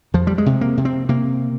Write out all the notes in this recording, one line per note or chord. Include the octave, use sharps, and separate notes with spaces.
F2 F3
G3
G#3
C3
A#3
C3
C4
C3 A#3